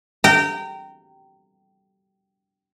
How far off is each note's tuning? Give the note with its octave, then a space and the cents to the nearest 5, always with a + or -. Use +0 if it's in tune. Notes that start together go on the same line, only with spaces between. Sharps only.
G5 -20 A#5 -25